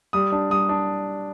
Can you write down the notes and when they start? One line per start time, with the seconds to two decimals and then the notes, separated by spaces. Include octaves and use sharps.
0.13 G3 D#6
0.32 D4
0.50 G3 D#6
0.69 D4